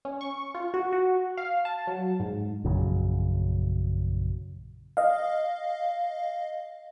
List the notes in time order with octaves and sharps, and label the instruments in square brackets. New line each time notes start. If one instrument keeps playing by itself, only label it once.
[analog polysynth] C#4
C#6
F4
F#4
F#4
F5
A5
F#3
G#2
[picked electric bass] A#1 F#2 C#3 F#3
[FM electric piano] D#5 F5